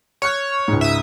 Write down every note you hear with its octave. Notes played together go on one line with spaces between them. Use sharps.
C#5 C#6 F6 F#6
C#2 G#2
E5 D#6